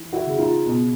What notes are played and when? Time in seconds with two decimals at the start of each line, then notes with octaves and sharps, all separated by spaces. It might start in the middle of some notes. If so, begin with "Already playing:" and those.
Already playing: E3
0.12 E4 F#4
0.26 C#3
0.39 D#4 F4
0.66 B2